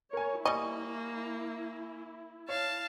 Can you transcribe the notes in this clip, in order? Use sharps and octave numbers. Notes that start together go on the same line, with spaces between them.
A#4 C#5 G#5
G3 A#3 E4 D#5 G#5 C#6
C#5 F5 A5